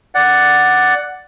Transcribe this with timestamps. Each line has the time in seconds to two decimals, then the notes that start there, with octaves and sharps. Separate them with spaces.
0.15 D5 F#5